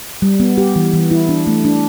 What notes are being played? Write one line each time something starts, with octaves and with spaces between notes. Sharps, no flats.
G3
B3
G4
E3
E3
E4
D4
A3
D4